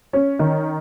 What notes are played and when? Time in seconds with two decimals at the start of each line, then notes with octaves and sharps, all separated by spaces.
0.13 C#4
0.39 D#3